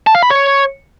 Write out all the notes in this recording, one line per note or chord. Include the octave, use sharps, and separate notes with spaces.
A5
F5
B5
C#5